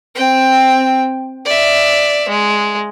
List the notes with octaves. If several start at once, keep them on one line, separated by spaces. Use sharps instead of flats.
C4 G5
D5 E5
G#3